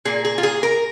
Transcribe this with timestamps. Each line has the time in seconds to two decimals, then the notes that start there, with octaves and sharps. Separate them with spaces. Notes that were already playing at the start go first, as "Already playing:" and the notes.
0.05 A#2 A#3 G#4
0.25 G#4
0.38 F4
0.43 G#4
0.63 A#4